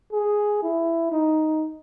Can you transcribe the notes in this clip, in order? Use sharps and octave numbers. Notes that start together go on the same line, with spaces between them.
G#4
E4
D#4